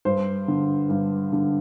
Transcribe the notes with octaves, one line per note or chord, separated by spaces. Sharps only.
G2 C5
D3
G2
D3